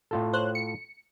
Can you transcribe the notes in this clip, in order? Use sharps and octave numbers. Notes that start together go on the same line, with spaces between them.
A2 F4 A4
C5 C#5 F#6
C#7